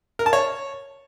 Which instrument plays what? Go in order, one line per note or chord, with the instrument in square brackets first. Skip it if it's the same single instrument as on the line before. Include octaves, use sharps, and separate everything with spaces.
[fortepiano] A#4
A5
C#5